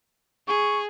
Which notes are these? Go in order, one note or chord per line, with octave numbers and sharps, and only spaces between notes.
G#4 C#6